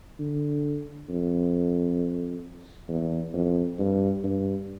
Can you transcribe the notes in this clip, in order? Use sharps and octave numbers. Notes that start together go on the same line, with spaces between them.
D3
F2
E2
F2
G2
G2